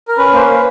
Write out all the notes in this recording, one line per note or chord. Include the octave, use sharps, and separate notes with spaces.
A#4
C#4 B4
A#3 C5
B4
A#3